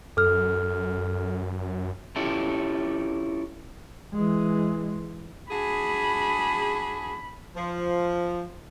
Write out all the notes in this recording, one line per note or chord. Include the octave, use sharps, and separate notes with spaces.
F#2 A4 F6
C#4 E4 F4 G4 A4
E3 G#3
D4 F#4 G#4 B5
F3